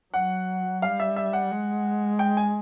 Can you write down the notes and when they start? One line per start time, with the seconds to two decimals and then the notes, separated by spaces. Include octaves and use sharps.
0.14 F#3 F#5
0.82 G3 F5
1.00 E5
1.16 E5
1.33 F#5
1.51 G#3
2.19 G5
2.37 G#5